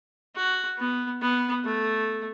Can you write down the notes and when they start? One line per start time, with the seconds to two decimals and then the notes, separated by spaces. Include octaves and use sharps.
0.36 F#4
0.78 B3
1.21 B3
1.64 A3